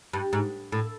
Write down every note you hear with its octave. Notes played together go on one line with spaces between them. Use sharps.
G2
G#2
A2